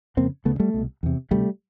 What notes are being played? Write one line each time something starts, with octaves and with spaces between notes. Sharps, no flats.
F2 C#3 A#3 C4
D2 C#3 A3 B3
G3 A3
C2 B2
E2 C3
D2 C3 G3 A3